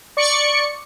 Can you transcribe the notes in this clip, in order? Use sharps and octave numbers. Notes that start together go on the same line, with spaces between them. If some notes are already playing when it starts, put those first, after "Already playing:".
D5 C#6 C#7